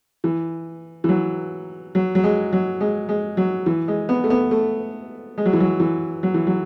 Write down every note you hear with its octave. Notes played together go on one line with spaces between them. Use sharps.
E3
E3
F#3
F#3
F#3
G#3
F#3
G#3
G#3
F#3
E3
G#3
B3
A3
B3
A3
G#3
F#3
E3
F#3
E3
F#3
E3
F#3